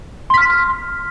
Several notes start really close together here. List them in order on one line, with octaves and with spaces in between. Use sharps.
C6 B6 F6